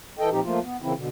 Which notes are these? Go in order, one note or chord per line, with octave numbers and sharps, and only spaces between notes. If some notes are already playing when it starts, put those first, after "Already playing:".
E3 A4 D#5 G5
A#2 F3 C4 D#4 G4
F3 A3 A#3 F4
B3
A#2 C#3 E3 A#3 C4 E4
B2 D3